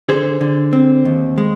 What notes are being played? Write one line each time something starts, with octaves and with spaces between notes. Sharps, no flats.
D3 G#4 C5
D3
C4
D#2
G#3